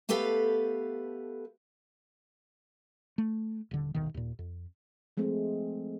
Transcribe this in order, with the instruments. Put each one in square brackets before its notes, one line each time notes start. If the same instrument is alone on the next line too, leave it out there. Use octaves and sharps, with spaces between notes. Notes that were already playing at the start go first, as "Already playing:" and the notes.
[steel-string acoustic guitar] A3 B3 G4 A4 B4 F5
[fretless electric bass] A3
D#1 D3
D#1 B1 D#3
D#2 A#2
F2
[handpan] F3 G#3 A3 C4